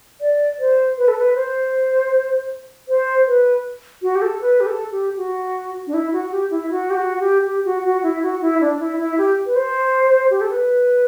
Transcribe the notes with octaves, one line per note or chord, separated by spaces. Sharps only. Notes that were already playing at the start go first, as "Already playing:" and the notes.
D5
C5
B4
A4
B4
C5
C5
B4
F#4
G4
A4
B4
G4
A4
G4
F#4
D4
E4
F#4
G4
E4
F#4
G4
F#4
G4
G4
F#4
F#4
E4
F#4
E4
D4
E4
E4
G4
B4
C5
G4
A4
B4